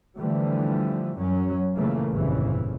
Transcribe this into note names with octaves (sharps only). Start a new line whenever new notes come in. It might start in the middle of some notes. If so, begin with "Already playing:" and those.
D3 E3 F3 G3 A3
F#2 F#3 C#4
A#2 C#3 E3 A3 A#3
G1 F2 A#2 C#3 E3